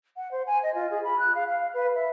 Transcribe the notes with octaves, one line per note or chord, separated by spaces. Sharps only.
F#5
C5
G#5
D#5
F4
G#4
B5
F#6
F5
F5
B4
E5